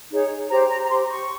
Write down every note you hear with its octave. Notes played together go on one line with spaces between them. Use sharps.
D#4 G#4 C#5
G4 C5 A#5
A#5
A#5
G4 C5 C6
C#6